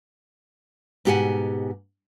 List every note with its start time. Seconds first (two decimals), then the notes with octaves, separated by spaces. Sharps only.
1.05 G#2 B2 G4 G#4 F#5 G#5